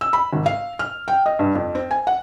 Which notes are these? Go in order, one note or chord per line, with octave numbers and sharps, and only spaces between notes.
E6
B5
G#1
F5
F6
G5
D#5
G2
F2
C4
G#5
F#5